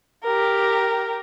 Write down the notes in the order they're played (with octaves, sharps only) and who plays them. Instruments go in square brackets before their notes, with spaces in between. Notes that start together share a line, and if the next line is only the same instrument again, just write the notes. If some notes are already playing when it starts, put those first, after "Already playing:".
[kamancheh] G4 A#4